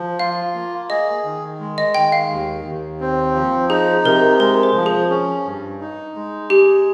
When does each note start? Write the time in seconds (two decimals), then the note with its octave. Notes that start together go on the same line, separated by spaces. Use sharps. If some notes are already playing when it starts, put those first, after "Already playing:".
Already playing: F3
0.19 F4 F5
0.55 A#3
0.89 G#4 D#5
1.25 D#3
1.60 G#3
1.78 D#5
1.95 D#3 G5
2.12 F5
2.31 D#2
2.65 D#2
3.00 C4
3.34 F3
3.69 D#4 G#4
4.05 C3 A#4
4.39 G#3 A#4
4.63 C5
4.76 F3
4.86 G#4
5.10 C#4
5.46 G2
5.81 D#4
6.16 G#3
6.50 G4 G#4